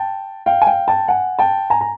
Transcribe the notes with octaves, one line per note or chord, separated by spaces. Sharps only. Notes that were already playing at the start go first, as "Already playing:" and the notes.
Already playing: G5 A5
F5 G5
G#5
F5 G5
G5 A5
F#5 G#5
G5 A5
G#5 A#5
A#5